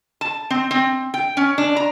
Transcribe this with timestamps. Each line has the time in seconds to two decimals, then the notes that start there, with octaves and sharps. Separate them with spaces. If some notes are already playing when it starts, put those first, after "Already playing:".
0.21 A5
0.50 C4
0.71 C4
1.14 G5
1.37 C#4
1.58 D4
1.77 A#5